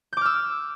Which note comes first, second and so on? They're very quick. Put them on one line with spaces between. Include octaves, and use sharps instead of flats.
G6 D6 F6 E6